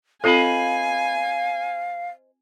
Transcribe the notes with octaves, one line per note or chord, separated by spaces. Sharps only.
C4 F4 A4 C5 D#5 F5 G#5 B5